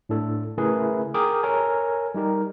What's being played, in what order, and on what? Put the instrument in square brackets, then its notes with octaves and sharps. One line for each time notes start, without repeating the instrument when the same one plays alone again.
[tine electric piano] A2 D4 A4
C#3 A3 E4 G#4 A#4 B4
G#4 A#4 G5 D6 D#6
A4 A#4 C#5 G#5
G3 D#4 G4 A#4